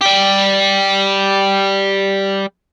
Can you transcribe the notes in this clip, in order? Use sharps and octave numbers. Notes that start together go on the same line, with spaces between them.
G3 G4